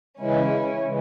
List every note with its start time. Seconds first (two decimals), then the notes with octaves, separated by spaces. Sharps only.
0.19 C#3 E3 G#3 C#4 E4
0.84 C#3 E3 G#3